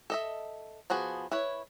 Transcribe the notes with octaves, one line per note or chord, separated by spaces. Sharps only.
A4 D#5 E5
F3 B3 F#4 G#4
E4 B4 C#5